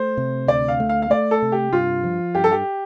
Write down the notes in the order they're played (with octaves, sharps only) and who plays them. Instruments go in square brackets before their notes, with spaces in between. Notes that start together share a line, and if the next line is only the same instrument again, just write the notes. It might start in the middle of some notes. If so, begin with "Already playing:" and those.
Already playing: [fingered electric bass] A3 [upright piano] C5
[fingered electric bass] C3
[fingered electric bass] D2 [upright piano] D5
[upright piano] F5
[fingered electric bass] A3
[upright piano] F5
F5
[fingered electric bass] A3 [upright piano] D5
[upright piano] A4
[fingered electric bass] C3
[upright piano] G4
[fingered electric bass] G2 [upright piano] F4
[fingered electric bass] F3
[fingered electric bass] G2 [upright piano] G4
[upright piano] A4
G4